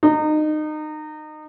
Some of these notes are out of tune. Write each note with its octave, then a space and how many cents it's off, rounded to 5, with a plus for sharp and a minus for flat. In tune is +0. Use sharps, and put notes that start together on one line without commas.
D#4 -25